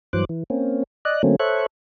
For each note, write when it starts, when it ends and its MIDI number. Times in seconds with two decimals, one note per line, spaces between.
0.13 0.25 43
0.13 0.25 52
0.13 0.25 54
0.13 0.25 72
0.13 0.25 86
0.13 0.25 90
0.29 0.43 52
0.50 0.83 58
0.50 0.83 60
0.50 0.83 61
1.05 1.22 74
1.05 1.22 75
1.05 1.22 90
1.23 1.36 50
1.23 1.36 54
1.23 1.36 57
1.23 1.36 58
1.23 1.36 60
1.23 1.36 61
1.40 1.66 69
1.40 1.66 72
1.40 1.66 73
1.40 1.66 76
1.40 1.66 85
1.40 1.66 90